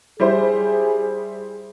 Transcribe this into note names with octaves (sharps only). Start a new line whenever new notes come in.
G3 E4 G#4 C5